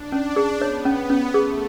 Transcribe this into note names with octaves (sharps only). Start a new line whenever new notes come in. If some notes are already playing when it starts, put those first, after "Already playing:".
Already playing: D4
C#4
G#4
B3 C#5
C#4
C#4
A3 G#4